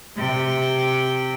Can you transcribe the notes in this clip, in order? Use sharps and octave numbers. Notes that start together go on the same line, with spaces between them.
C3 G5